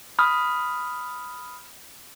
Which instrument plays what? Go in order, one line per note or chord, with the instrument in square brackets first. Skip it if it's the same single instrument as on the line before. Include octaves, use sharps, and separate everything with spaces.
[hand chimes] B5 D#6 F6